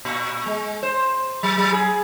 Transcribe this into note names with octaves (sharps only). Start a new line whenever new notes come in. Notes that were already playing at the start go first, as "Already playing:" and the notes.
A#2
G#3
C5
F#3
F#3
G#4